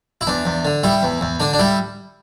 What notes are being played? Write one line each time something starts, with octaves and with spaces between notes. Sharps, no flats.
E4
E2 D4
E2
D3
G3 E4
E2
E2
D3 D4
D4
G3 E4